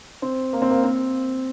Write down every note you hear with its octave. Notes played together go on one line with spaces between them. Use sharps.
C4
A#3
C4
A#3
C4